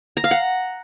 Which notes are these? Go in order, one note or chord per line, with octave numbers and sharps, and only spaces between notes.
A#5
F5
F#5